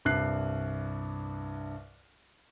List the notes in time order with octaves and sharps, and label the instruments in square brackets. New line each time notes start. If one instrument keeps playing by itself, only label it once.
[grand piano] C2 G2 F#6 C7